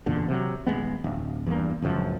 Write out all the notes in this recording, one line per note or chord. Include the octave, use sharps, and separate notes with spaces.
F#1 E2 A#2 D3
C3 F#3
D#1 C#2 G#3 B3
D1
E2 G2 A#3
D1 C#2 F#2 F3